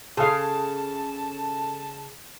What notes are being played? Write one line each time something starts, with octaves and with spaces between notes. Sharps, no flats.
C#3 G#4 A4 F5 A5